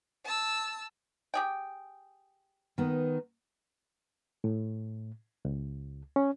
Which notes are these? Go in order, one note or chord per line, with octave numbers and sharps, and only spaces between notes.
A5 E6
G4 G#4 G5
D#3 B3
A2
C#2
C#4